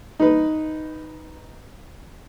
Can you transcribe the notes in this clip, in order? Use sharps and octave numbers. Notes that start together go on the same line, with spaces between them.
D#4 B4